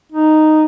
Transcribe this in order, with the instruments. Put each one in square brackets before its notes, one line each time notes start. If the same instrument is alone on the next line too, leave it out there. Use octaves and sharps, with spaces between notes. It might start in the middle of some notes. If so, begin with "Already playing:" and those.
[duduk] D#4